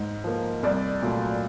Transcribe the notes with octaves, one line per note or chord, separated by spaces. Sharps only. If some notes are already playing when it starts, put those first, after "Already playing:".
Already playing: G#2
F3 A#3
C2 D5
A#2 F#3 A3